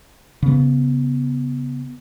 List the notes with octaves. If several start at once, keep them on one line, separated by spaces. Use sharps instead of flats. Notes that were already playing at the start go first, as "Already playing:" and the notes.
C#3 B3